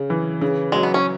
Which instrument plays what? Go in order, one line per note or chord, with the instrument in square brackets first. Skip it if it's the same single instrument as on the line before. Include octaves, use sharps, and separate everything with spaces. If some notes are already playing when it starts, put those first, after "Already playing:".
Already playing: [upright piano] C#3
E3
C#3
[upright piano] F#3 [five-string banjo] G#3
[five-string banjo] B3
C#4